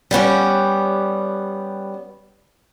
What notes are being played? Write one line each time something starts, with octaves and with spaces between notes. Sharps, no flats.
G3 B3 C#4 G4